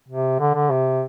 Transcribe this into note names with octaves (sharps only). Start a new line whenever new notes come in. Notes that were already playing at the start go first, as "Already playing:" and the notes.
C3
D3
D3
C3